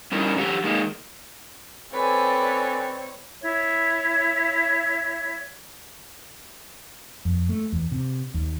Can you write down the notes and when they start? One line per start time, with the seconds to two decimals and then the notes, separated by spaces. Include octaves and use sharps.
0.12 G3 C#4 D#4 E4 A#4
0.36 D3 F#3 G4 F#5
0.64 D#3 G#3 A#3
1.93 C4 A4 B4 C#5 D5 G5 G#5
3.42 E4 C#5 E5
7.25 F2
7.49 A3
7.72 E2
7.92 C3
8.34 D#2